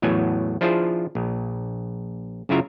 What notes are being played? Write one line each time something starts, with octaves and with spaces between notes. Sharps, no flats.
E2 A2 F#3 B3 G#5
F3 D4 E4 F4 G#4 C5
A#1
F#2 C#3 E4 F4 E5 A#5